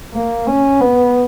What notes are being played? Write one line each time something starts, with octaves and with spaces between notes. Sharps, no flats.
A#3
C#4
B3